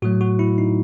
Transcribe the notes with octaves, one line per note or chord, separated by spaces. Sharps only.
A2 F#3 A3 F#4
F#4
E4
D#4